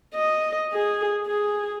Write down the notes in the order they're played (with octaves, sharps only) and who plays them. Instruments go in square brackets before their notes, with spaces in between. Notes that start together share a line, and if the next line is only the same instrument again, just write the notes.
[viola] D#5
G#4
G#4